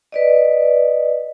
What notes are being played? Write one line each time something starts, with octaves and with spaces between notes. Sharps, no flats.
B4 D5 D#5